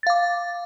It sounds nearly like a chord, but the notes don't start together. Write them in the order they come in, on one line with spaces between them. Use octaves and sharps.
A6 F5 D6